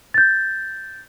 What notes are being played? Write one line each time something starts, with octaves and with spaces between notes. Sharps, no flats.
G6 A6